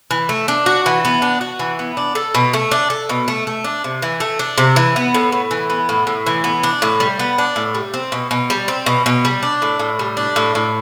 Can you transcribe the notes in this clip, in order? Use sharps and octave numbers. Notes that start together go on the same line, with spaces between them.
E3
A3
D4
F#4
E3
B3
D4
F#4
E3
B3
D4
A4
B2
A3
D4
A4
B2
A3
A3
D4
C3
E3
A3
D4
C3
E3
B3
A2
A2
E3
B3
A2
A2
E3
B3
D4
A2
G3
B3
D4
A2
G3
C4
B2
B2
G3
C4
B2
B2
G3
D4
A2
A2
G3
D4
A2
A2